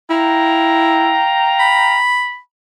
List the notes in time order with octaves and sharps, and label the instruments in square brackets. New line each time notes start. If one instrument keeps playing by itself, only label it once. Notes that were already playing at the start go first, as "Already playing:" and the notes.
[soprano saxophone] E4 [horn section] F5 G5 A#5
[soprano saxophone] B5